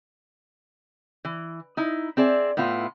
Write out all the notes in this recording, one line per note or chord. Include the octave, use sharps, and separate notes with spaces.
E3
D#4 E4
C4 G#4 D5 E5
A2 B3 E4 F4